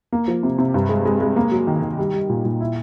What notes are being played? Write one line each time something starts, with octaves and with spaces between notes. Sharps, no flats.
A#3
F3
C3
C3
G2
G#3
G#3
G#3
A#3
F#3
D#3
D#3
G3
G3
A#2
A#2
E4